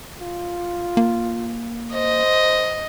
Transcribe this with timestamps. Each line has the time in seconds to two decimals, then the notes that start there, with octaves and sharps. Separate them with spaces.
0.21 F4
0.97 A#3
1.94 C5 D#5